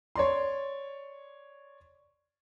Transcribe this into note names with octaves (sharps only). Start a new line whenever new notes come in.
C#5 D5 C6